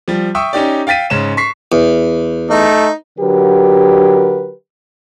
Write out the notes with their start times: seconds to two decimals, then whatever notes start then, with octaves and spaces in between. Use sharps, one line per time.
0.08 F3 G3
0.35 E5 G5 C#6 D#6 E6
0.53 C#4 D#4 G4 D5
0.87 F5 G5 A6 B6 D#7
1.10 G#2 C#3 C#4 E7
1.37 C#6 B6 C7
1.72 E2
2.50 A3 D#4
3.19 D3 F#3 G4 A#4 B4